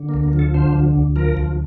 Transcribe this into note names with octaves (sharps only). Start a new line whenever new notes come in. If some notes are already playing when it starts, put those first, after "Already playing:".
Already playing: D3
A#3
D2
A#3
F3
A4
D3 C5
D2
D2
F3 A#4
D2